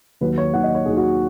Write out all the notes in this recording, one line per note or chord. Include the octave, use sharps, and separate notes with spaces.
D#2 D#3 F#3 B4
C#5
D#2 D#3 F#3 F#5
D#5
C#5
D#2 D#3 F#3 G#4
F#4